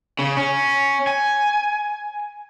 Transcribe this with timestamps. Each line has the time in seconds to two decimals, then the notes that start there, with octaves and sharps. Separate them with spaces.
0.19 C#3
0.37 C#4
1.07 G#5